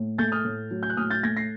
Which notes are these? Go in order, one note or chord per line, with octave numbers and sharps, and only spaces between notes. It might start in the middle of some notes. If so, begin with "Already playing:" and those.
Already playing: A2
A3 G6 A6
D#6 F6
A2
F#3
G6
F#6
A2 D#6 F6
G6 A6
A3 G#6 A#6
A#6 C7